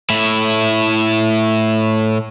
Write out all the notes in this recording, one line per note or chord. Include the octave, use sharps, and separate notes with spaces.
A2 E4